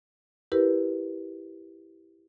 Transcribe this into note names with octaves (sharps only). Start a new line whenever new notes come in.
E4 G4 A#4 B4